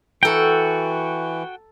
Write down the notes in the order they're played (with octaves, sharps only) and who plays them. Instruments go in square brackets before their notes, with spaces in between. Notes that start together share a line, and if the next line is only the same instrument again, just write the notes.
[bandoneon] E3 [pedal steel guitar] F#4 G5 [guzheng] A4 A#5